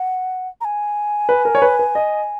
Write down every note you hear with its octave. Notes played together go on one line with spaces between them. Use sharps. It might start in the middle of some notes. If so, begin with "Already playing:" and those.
Already playing: F#5
A#5
G#5
B4
A#4
C#5
B4
B4
D#5